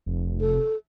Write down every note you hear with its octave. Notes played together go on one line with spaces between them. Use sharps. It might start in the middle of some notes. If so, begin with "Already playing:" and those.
F1
A4